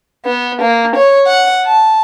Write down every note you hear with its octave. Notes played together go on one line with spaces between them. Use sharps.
B3
A#3
C#5
F#5
A5